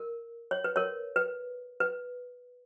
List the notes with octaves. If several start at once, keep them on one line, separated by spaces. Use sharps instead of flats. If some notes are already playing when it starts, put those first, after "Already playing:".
Already playing: A#4
C#5
B4
A#4 C#5
B4
B4